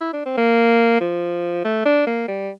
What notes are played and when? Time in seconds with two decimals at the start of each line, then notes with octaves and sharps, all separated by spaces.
0.01 E4
0.13 D4
0.26 C4
0.37 A#3
1.01 F3
1.65 A3
1.86 D4
2.07 A#3
2.28 G3